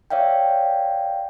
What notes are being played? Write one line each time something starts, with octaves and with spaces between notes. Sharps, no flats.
C#5 D5 E5 F5 G5